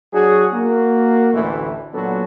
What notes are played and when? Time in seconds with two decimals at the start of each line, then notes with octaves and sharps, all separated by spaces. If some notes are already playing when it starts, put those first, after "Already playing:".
0.13 F#3 D4 F#4 G#4
0.53 A#3 F#4
1.33 A1 D2 E3 A3
1.94 A#2 F#3 B3 D4 F#4 A4